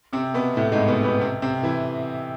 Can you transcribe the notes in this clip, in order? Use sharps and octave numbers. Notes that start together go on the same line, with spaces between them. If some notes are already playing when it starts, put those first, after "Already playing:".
C3 C4
B2 B3
A2 A3
G#2 G#3
B2 B3
B2 B3
C3 C4
C3 C4
E3 E4